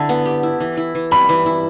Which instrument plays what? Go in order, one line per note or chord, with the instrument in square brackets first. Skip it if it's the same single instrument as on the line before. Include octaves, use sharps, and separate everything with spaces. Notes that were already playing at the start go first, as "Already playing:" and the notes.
Already playing: [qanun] D3 E4 [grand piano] A5
[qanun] B3
G4
E4
E3
E4
E3
[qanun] G3 [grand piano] B5
[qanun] E3
E4